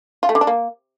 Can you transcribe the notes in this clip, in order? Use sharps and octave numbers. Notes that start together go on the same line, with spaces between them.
F4
A3
D3
D4
A#3